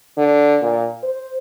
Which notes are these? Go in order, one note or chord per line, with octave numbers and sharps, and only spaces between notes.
D3
A#2
C5